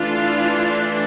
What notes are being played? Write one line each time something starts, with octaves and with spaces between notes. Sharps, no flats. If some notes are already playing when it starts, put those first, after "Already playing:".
Already playing: E3 A3 D4 F4